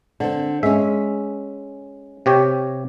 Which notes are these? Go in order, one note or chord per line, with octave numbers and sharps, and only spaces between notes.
D3 C4
G#3 C#4 E5
C3 G4 C#5